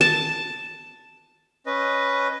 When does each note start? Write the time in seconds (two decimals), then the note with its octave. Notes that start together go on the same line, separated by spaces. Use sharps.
0.01 A5
1.66 C#4 B4 D#5